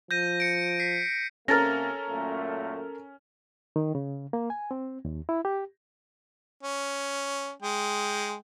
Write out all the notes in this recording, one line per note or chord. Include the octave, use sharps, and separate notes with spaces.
F3 G6 A#6 D#7
C#7 D7
B6 C7
C3 A#3 C#4 A4 A#4 F6 A6 A#6
F#2 A#2 A3
D#3
C#3
A#3
G#5
C4
D#2
E4
G4
C#4
G#3 G5